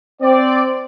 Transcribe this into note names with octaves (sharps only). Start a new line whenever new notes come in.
C4 D5